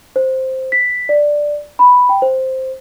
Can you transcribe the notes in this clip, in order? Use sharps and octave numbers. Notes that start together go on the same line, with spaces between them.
C5
B6
D5
B5
G5
C5